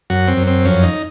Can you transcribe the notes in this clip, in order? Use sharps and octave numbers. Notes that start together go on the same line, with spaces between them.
F#2 F#4
C4
F#2
C4
F2 C#4
D#4